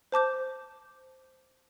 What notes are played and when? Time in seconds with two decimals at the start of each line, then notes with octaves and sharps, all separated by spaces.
0.12 C5 A5 D6 G6